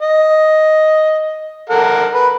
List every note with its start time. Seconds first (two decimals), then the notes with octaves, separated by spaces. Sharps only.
0.01 D#5
1.70 A4 A#4 F#5
2.14 B4